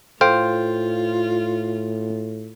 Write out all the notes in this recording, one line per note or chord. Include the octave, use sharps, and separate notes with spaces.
A2 F4 A4 C5 F5 G5 D7